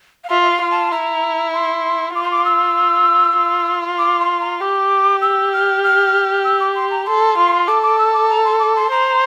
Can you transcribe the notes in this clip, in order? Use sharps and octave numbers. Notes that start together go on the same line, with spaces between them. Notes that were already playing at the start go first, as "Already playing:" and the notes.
F5
F4 E5
E5
F5
F4
A5
E4 A#5
C6
F4 D6
C6
D6
E6
F4
D6
C6
A#5
G4 D6
E6
F6
F6
E6
D6
C6
A#5
A4 C6
F4
A4 D6
D6
E6
D6
A#5
C6
D6
C6
C5 A#5